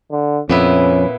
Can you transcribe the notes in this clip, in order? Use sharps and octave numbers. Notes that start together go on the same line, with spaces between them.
D3
F2 A#2 B3 C#4 E4